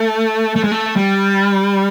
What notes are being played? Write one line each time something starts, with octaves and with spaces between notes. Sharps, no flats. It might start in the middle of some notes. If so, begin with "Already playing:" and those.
Already playing: A3
A3
G#3
A3
G3